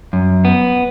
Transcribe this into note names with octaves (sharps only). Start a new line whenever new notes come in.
F#2
B3